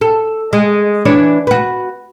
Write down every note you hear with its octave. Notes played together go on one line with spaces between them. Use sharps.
A4
G#3
E3 D4 C#5
F#4 B4